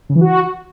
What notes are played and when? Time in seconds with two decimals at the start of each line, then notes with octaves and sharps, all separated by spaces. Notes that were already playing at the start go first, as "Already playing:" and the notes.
0.09 C#3
0.15 E3
0.21 F#4